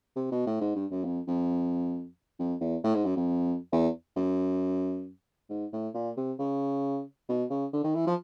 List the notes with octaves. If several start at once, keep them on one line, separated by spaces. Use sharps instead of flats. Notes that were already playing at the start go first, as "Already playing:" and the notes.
C3
B2
A2
G#2
G2
F#2
F2
F2
F2
E2
A2
G#2
F#2
F2
E2
F#2
G#2
A2
A#2
C3
C#3
B2
C#3
D3
D#3
E3
F3